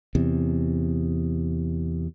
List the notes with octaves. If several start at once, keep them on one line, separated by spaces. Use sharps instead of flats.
E2 C3